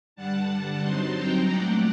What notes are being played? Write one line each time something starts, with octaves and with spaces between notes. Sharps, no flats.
G2 D3 G3 D4 F#5 A5
G2 F#3 C4 D#4 A5 C6
G5 A#5
A#2 A3 D4 D5 F#5